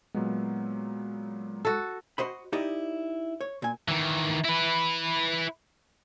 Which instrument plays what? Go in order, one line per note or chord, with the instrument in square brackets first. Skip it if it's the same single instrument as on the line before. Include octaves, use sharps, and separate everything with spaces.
[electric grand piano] A#2 F#3 B3 [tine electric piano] G#3
[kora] F#4 A4
[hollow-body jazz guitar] F#4 C5 D#5 B5
D#4 E4 G4 D5 D#5
C#5
A#2 G#5
[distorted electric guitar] D#3 E3
E4 B4